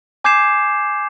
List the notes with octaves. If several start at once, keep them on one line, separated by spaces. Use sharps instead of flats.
G#5 D6 G6 G#6 C7 E7